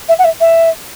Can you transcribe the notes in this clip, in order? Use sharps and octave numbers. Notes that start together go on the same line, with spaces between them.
E5
F#5
E5
E5